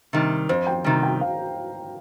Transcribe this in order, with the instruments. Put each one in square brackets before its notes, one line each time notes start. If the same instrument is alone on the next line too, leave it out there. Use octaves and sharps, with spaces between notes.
[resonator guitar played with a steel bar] C3 D#3 G3
[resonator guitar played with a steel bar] F2 [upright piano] C5
[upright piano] G5
[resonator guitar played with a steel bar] C3 D#3 G3 [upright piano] A#5
[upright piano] G5
F5